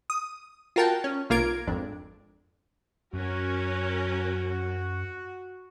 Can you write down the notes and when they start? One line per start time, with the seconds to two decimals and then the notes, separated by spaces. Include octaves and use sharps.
0.10 D#6
0.76 F4 F#4 A#4 G5 A5
1.04 C#4
1.30 B1 A#3 F4 A#4 G#6 D7
1.67 G#1 F2 D4
3.13 F#2 F#3 C#4 F#4 A#4